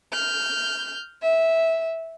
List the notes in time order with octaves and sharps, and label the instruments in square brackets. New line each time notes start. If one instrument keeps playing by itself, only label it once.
[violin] F6 G6
E5